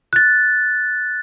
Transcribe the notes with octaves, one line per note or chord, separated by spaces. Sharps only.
F#6 A6